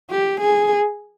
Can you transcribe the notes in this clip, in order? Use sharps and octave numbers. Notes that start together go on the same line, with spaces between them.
G4
G#4